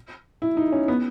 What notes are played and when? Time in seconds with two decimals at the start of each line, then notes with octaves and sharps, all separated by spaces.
0.42 E4
0.57 D#4
0.72 C#4
0.88 B3